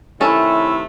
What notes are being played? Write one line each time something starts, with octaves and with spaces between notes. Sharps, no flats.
C3 D#3 A3 C#4 E4 A4